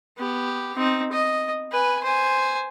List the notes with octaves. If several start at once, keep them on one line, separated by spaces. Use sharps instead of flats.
B3 G4
C4 D#4
D#5
B4 G#5
C5 G#5